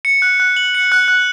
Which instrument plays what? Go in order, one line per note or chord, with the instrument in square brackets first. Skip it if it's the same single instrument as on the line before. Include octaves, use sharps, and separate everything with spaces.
[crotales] C#7
F#6
F#6
F#7
C#7
F#6
F#6